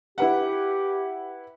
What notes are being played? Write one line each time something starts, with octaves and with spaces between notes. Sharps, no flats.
E4 G4 B4 F#5